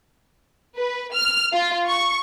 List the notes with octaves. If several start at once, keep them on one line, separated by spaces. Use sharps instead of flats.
B4
F6
F4
C#6